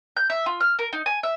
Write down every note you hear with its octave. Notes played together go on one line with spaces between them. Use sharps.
G6
E5
F4
F6
A#4
D#4
G#5
E5